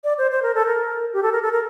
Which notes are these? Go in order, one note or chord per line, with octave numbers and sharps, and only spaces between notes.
D5
C5
C5
A#4
A4
A#4
G4
A4
A#4
A4
A#4